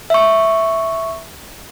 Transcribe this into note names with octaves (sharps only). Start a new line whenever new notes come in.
E5 C#6